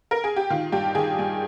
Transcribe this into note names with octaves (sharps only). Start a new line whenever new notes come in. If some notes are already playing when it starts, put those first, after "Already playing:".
A#4
G#4
G4
D#3 F4
G2 G4
D#3 G#4
G2